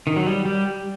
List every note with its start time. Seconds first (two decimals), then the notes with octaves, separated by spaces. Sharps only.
0.07 D#3
0.16 F#3
0.26 G3
0.45 G3